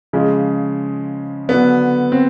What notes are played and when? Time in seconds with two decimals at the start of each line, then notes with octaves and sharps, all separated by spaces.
0.13 C#3 F3 G#3
1.49 D3 F#3 B3
2.12 C4